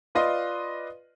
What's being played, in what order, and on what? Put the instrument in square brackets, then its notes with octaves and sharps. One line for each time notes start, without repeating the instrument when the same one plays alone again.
[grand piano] F4 B4 D5 D#5 F5 C6